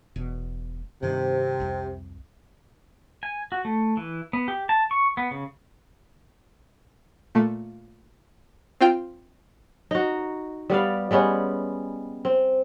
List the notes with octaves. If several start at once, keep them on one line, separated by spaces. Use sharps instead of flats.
E1 B2
G2 C3 D#3
C2 F2
G#5
F#4
A3
E3
B3
G4
A5
C#6
B3
C#3
A#2 A3
C4 F4 G5
D#4 F#4
G3 B3 D5 F5
G3 G#3 B3 C#4
C4